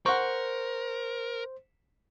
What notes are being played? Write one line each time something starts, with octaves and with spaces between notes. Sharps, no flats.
A#4 C5 F#5 C#6